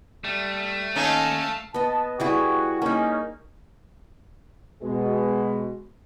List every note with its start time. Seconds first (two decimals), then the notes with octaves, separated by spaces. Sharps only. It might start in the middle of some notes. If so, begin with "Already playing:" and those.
0.24 G3 A3
0.95 D#2 C#4 D#4 A4 F5 G#5 A5
1.74 B3 D#5 A5
2.20 G3 E4 F#4 G#4
2.82 A#3 C#4 D#4
4.82 B2 G#3